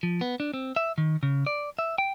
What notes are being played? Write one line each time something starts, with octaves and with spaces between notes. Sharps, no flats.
F3
B3
D4
C4
E5
D#3
C#3
D5
E5
G5